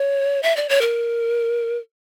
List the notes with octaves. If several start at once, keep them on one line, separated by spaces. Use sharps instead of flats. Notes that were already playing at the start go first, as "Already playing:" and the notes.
Already playing: C#5
E5
D5
C#5
A#4